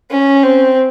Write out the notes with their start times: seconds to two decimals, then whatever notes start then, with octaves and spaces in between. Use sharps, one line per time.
0.10 C#4
0.43 C4